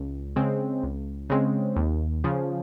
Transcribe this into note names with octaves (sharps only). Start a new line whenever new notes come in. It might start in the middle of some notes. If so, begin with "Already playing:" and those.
Already playing: C#2
C#3 G#3 C4
C#2
C#3 G#3 C4
D#2
C#3 F3